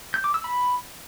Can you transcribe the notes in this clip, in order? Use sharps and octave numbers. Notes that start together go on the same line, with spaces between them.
G6
D6
E6
B5